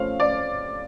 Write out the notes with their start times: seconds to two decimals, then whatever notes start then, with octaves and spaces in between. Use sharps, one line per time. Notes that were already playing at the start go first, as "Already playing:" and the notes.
Already playing: F3 A3 C#4 F5
0.20 D5